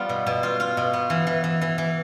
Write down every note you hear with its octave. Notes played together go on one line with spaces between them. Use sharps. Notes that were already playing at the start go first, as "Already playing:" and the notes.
Already playing: G3 B3 F4
B2
B2
F4
F4
B2
B3
E3
E3
E3
E3
E3